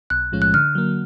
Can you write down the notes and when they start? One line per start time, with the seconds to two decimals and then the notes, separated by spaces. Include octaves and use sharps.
0.10 B1 F#6
0.32 A2 F3 G#3 C#4
0.42 F#6
0.54 D3 F6
0.75 F#3 A#3